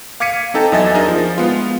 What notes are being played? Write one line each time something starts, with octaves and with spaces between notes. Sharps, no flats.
F5 D6 G#6 B6 C#7 D#7
C4 D#4 A4 G5 A5 A#5
E2 F#3 D#5 E5 G#5 A6
D4 D#4 G#4 A#4 D#5
F3
G#3 B3 F4